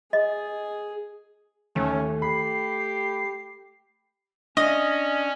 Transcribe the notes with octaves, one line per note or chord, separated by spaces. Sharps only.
G#4 D#5
D#2 A3 C#4
G4 B5 C7
C#4 D4 D#5